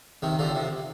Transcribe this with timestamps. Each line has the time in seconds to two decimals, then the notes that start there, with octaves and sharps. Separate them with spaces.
0.22 C3 D#3
0.39 D3 F3
0.55 C3